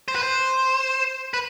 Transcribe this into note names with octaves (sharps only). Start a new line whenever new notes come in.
C5
B4
C5
B4